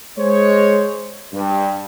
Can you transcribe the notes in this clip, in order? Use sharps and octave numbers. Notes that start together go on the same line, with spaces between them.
G#3 C5 C#5
G2